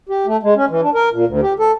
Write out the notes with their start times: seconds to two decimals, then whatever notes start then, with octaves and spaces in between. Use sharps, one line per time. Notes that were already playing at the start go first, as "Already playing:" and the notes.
0.09 G4
0.26 A3
0.43 G#3
0.56 C#4
0.70 E3
0.82 D4
0.94 A#4
1.12 A#2
1.27 D2
1.42 G4
1.59 A4